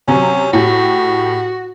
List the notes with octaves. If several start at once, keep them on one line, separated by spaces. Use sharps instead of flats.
C3 F#3 C#4
A2 F#4 G4